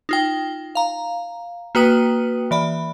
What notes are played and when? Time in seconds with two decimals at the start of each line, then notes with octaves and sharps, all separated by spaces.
0.09 D#4 F4 G5
0.75 F5 A#5
1.75 A#3 F#4 B4 G5 D#6 D#7
2.51 E3 D5 B5